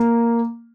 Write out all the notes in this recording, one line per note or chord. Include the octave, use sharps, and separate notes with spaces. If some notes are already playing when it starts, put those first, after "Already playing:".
Already playing: A#3